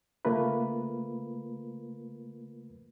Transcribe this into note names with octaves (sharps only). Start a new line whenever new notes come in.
C#3 A3 A#3 F4 A#4 B4